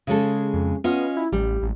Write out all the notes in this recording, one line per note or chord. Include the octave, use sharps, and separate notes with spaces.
C#3 G#3 A4
F2
B3 C#4 F4 D#5
E4
A1 G3
A1